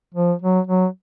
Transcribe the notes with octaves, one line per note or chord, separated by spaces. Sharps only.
F3
F#3
F#3